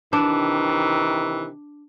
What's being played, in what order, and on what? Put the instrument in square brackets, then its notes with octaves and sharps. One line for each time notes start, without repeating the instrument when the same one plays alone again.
[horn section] C3 D#3 E3 [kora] D4